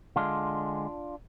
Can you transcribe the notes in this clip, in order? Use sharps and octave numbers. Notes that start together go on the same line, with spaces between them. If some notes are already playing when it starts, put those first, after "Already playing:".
D3 G#3 D4 F4